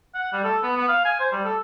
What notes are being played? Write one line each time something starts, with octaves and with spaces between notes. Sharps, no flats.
F#5
G3
A4
B3
B3
F5
G#5
C5
G3
A4